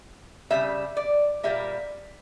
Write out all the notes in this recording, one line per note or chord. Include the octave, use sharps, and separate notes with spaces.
C#3 G3 A#3 E5
D5
A#2 G3 A#3 E5